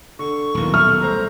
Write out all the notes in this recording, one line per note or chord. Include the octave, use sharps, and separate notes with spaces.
D3 C#6
D#1 B1 E3 A#3
A4 E5 C#6 F6
G3 A3 C5 A#5